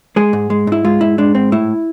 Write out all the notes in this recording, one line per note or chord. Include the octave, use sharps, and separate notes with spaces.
G#3 G#4
G#2
G#3
G#2 E4
G#3 F4
G#2 E4
G#3 D4
G#2 C4
A2 E4